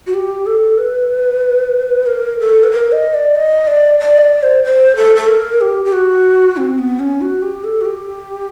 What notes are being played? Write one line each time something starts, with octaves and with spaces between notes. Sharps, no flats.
F#4
G4
A4
B4
A#4
A4
B4
A#4
D#5
D5
D#5
D5
D5
D#5
D5
C5
C5
A4
A4
A#4
G4
G4
F#4
C4
B3
C#4
F#4
G4
A4
F#4
G4